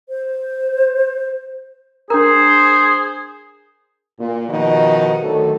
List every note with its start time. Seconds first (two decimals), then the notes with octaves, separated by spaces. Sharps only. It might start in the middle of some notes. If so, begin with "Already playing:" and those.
0.09 C5
2.10 D4 G#4 A#4 C5 A#5
4.19 A#2
4.49 B2 D#3 F3 D#4 G4
5.23 D2 D#3 F#3 A3 A4